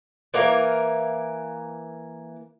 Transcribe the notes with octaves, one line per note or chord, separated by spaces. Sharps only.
E3 A#3 A#4 F5